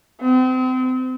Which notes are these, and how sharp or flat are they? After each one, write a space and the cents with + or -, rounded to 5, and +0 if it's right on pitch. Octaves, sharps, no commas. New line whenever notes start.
C4 -35